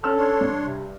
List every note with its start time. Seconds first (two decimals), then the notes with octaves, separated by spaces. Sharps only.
0.03 C#4 A4 E6 F6
0.16 D4 C#5 C6
0.41 G2
0.63 C3